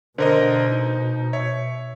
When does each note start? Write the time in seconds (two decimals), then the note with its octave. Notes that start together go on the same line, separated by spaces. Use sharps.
0.18 B2 D3 A#4 C5 D#5
0.72 D#4
1.33 C#5 E5